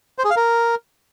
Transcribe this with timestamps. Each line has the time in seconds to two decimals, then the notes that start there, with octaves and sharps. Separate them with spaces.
0.19 C5
0.24 G#4
0.30 F5
0.36 A#4